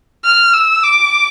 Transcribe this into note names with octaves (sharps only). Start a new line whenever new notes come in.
F6
E6
D6